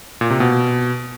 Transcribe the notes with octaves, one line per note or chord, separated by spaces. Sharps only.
A#2
C3
B2